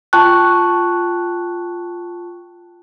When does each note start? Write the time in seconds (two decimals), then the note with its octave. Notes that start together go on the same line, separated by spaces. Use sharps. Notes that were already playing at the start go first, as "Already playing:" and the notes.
0.13 F4 G5 A5 C#6 F#6